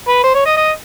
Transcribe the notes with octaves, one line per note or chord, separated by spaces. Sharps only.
B4
C5
C#5
D#5
D#5